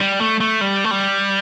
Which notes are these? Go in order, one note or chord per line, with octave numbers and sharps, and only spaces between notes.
G3
A3
A3
G3
A3
G3